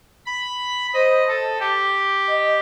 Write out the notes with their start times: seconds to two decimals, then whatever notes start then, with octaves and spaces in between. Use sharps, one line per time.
0.26 B5
0.93 C5 D#5
1.28 A4
1.60 G4
2.27 D#5